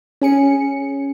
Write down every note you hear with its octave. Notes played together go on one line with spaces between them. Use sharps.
C#4 G#4 C#7